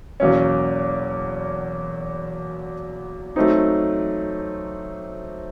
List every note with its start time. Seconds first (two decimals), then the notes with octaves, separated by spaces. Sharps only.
0.20 E2 B2 F#3 A#3 C#4
3.36 F#3 A3 C4 D#4